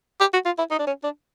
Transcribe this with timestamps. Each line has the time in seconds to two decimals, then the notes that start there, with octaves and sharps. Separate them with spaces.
0.20 G4
0.33 F#4
0.45 F4
0.58 E4
0.71 D#4
0.79 D4
0.87 C#4
1.04 D4